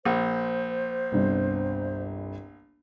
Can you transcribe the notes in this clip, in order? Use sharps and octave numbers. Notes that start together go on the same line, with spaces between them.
A#1 C5
G1 C2